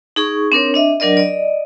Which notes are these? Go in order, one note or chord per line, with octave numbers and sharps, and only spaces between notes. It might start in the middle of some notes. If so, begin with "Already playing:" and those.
D#4 G#4 C#6
C4 D4 A#4 C#5
D4 D#5 E5
F#3 D4 A#4 D5 D#5
D5 D#5